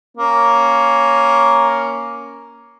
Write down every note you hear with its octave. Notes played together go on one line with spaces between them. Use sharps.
A#3 C#4